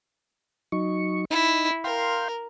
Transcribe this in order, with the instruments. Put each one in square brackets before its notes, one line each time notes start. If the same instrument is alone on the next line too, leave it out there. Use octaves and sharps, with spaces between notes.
[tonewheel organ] F#3 D#4 C#6
[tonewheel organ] D#4 [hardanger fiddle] E4
[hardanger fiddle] A#4 [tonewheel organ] F5 G5 C6